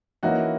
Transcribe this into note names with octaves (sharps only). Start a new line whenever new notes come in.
E3 A#3 C#4 D#4 E4 F#4